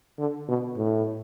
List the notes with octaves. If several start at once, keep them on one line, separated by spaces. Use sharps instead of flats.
D3
B2
A2